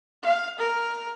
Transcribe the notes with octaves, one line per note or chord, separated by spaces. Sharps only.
F5
A#4